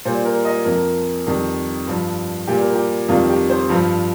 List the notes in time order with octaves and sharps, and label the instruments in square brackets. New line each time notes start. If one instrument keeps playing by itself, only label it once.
[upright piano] A#2 G3 C5
A#4
D#5
F2 F3 A#4
F2 D#3 G3
G2 F3
A#2 G3 G4
A#4
G4
F2 D#3 G3 F4
G4
C5
G2 F3